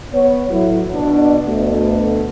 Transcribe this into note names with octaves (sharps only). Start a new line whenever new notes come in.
B3 C#5
A2 F#3 E4
B2 D4
D2 B2 A3